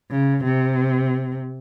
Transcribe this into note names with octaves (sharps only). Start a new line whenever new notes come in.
C#3
C3